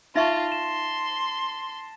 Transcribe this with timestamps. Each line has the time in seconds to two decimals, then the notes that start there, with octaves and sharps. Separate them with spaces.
0.16 D#4 F4 E5 A5 C#6 A6 A#6
0.52 C6 E7